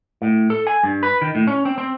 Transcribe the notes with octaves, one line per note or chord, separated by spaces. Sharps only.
A2
A4
G#5
G2
B4
D#3
A2
C#4
C4
C4